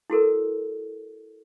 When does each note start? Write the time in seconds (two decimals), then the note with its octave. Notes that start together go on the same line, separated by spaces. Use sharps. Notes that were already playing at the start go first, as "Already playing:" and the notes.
0.10 E4 F#4 A4 A#4